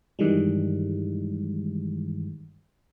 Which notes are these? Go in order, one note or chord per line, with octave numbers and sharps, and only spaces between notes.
G2 D#3 E3 G3 G#3